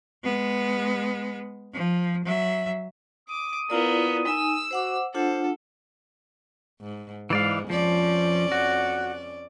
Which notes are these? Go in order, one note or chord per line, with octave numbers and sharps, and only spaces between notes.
G#3 B3
F3
F#3 E5
D6 D#6
A#3 B3 E4 F4 D5
D#4 G#5 E6
F#4 C5 F#5 D6
D4 F4 A4 C5 F#5
G#2
G#2 E3 G#3 D5 F5
F2 F3 C#4 D5
F#4